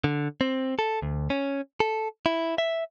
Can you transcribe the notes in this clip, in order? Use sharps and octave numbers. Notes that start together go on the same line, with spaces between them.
D3
C4
A4
D2
C#4
A4
E4
E5